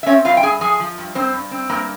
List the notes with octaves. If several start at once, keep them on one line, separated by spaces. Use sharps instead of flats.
E5
C4 C#4 C#5
G2 F4 F5
G5
G2 G#4 G#5
F3 G#4 G#5
F3
G2
G2 C4 C5
G2
C4
G2 A#3 A#4